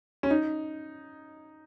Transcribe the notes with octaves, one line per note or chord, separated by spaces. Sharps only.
C#4
D#4